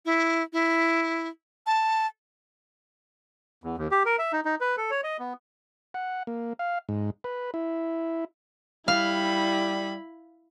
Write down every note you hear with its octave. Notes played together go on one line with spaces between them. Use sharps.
E4
E4
A5
E2
D#2
G4
A#4
E5
D#4
D#4
B4
A4
C#5
D#5
B3
F#5
A#3
F5
G#2
B4
E4
G3 E4 F5 B5